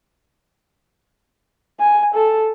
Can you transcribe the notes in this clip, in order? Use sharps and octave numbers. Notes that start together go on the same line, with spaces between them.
G#5
A4